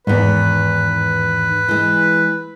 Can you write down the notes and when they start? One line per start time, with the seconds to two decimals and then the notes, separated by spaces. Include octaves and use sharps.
0.07 E2 G#2 D#3 B4
1.68 E3 G#3